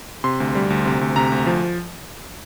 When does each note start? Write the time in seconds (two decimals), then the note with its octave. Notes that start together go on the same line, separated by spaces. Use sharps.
0.24 C3 C6
0.40 D2
0.55 G3
0.70 D2
0.86 C3
1.01 D2
1.16 C3 A#5
1.32 D2
1.46 F3